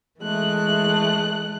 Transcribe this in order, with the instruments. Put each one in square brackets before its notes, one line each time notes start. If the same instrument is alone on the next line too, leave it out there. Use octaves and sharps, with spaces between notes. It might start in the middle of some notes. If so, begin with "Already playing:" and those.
[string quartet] E3 G#3 A3 F#6